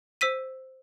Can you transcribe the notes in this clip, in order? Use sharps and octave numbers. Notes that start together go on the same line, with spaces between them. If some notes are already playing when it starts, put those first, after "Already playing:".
C5 E6 B6 D#7